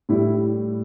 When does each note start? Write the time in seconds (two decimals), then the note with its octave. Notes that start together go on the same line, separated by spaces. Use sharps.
0.09 A2 G3 E4